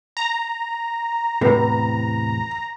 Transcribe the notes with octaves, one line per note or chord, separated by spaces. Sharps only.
A#5
E2 A2 C3 B4